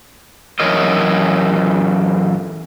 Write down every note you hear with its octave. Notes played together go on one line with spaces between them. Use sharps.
F#2 E3 A#4 C#5 D#5